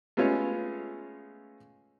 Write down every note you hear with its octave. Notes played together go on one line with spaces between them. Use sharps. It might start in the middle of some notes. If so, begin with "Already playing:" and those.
G#3 A3 B3 C#4 F4 C#5